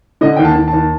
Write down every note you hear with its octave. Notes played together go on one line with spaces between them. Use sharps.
D3 D#5
D#2 G5
A5
D#2
A5
D#2